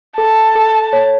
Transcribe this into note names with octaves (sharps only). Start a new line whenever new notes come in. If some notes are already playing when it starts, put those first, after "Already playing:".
A4 A5
A4
C#5